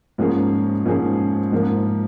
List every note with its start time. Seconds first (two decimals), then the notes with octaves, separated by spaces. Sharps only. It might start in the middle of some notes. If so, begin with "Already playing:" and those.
0.18 G#2 F3 A#3 C#4 G#4
0.85 G#2 F3 A#3 C#4 G#4
1.52 G#2 F3 A#3